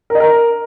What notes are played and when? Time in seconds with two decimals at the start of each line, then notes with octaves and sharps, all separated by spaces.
0.10 A#4
0.15 D#5
0.20 A#4